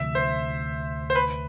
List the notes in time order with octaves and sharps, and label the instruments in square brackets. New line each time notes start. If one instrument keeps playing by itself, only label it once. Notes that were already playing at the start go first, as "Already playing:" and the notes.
Already playing: [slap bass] D2 C3 F3 [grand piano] E5
[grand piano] C5
C5
B4